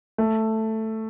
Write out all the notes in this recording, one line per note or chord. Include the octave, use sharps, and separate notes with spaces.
A3